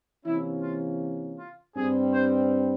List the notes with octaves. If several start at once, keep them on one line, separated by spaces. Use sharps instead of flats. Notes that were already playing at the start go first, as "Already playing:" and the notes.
C3 E3 A#3 C#4 E4
F4
F4
G2 G3 C4 G#4
C5